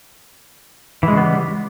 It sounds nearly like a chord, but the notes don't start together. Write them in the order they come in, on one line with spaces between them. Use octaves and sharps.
E3 G#3 C#3 B3 G3